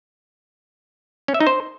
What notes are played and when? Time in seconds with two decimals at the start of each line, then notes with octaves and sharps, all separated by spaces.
1.28 C#4
1.34 E5
1.40 D#4
1.47 C5